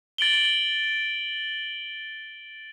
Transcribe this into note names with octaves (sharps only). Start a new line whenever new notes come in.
A6 D7 F#7 G7